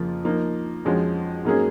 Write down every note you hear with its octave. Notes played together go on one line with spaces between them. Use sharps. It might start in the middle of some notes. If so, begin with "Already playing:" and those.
Already playing: F2 C#3 F3 A#3 F4
F3 A#3 D#4
F2 F3 G#3 C#4 F#4
G#2 F#3 A#3 C#4 G#4